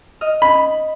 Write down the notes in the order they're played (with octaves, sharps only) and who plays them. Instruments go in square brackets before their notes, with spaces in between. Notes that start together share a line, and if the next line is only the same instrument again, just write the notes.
[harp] D#5 F6
[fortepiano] B5